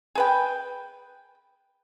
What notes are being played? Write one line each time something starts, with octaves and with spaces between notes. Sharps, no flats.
G#4 B4 G5